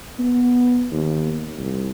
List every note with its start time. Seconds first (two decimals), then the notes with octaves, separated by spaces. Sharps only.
0.20 B3
0.92 D#2
1.59 C2